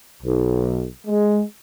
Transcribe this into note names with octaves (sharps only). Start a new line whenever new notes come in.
B1
G#3